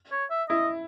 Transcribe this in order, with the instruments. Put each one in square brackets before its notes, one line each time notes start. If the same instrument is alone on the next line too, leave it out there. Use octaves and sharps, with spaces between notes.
[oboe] C#5
E5
[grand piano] E4 [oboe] D#5